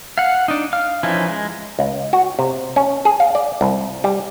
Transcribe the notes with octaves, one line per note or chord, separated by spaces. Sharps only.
F5 F#5
D4 D#4
F5 F6
E3 F3 C#4 D#4 E4
G#3
C#2
F#4
C3
C#4
G#4
F5
D5
C2
G3